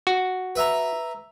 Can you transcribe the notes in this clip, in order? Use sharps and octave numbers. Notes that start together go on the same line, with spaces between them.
F#4
B4 E5 A#5